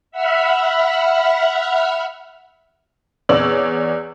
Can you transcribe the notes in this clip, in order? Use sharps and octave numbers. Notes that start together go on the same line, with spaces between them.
E5 F#5 B5 E6 F6
E2 C#5 D5 E6 F#7